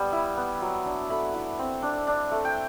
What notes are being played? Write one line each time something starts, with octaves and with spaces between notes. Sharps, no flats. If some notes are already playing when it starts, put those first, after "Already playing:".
Already playing: G3 B3
E4
B3
F#3
D4
A3 B5
E4
C4
D4
D4
A3
G5